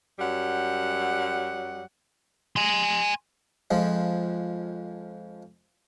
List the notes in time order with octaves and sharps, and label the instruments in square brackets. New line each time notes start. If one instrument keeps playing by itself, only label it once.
[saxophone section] F#2 F#3 G3 F#5
[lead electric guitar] G#5 C6
[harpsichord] F2 F3 G#3